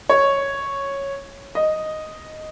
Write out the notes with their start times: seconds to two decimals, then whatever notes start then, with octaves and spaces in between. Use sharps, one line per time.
0.09 C#5
1.55 D#5